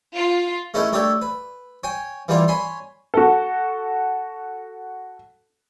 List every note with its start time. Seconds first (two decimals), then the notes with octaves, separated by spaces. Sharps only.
0.15 F4
0.74 G#3 A3 C#4 D#4 E4 A#4
0.93 A3 D4 G4 C#5 D5 E5
1.22 B4
1.84 C#5 G5 G#5
2.28 E3 G3 A#3 D4 F4 D5
2.48 C#5 G#5 B5 C6
3.14 F#4 A4